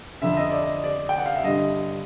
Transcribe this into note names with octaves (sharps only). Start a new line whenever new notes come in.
F2 D3 E5
D#5
D5
D#5
D5
G5
F#5
F5
E5
G2 D3 D#5